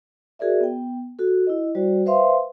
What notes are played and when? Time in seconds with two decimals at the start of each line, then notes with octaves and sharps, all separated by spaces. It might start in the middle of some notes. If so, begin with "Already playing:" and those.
0.39 F#4 G#4 A#4 D5 E5
0.61 B3 G5
1.19 F#4 A4
1.47 E4 D#5
1.75 G3 F#4 C5 D5 G5
2.06 B4 C5 E5 F5 C6